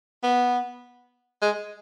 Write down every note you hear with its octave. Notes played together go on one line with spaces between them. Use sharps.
B3
G#3